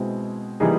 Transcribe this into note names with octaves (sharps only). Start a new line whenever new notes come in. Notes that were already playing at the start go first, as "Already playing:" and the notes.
Already playing: B2 G#3 C4 E4
E3 G3 A#3 D#4 G#4